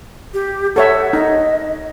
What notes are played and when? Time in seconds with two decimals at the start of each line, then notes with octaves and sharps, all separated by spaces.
0.34 G4
0.76 A4 C#5 E5 F#5
1.13 D#4 D#5